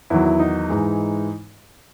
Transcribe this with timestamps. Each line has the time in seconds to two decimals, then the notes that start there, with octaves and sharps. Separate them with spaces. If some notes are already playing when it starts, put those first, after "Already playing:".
0.10 E2 D#3 F#3 E4
0.25 E4
0.39 D#4
0.69 G#2 E3 G#3